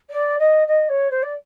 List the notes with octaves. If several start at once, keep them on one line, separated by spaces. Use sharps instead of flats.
D5
D#5
D#5
C#5
C5
D5